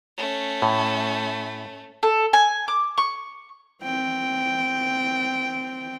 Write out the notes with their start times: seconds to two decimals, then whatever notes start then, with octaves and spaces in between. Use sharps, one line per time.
0.18 A3 C#4
0.62 A2
2.03 A4
2.33 G#5
2.68 D6
2.98 C#6
3.83 C4 G5